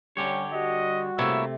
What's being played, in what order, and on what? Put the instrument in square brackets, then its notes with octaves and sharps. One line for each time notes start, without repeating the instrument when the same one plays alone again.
[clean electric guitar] D3 G4 C#5 [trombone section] G3 C#4
[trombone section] G3 F#4 [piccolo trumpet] D#5
[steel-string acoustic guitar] C3 A3 [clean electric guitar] A#3 E4 C#5 [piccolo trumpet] E6